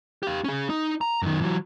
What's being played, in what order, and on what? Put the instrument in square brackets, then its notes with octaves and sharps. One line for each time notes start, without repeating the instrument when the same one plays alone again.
[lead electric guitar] G4 F5
C#4 G#4
D#4
A#5
F#2 D#3
E3 F#3